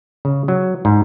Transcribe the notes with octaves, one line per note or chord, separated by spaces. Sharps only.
C#3
F#3
G#2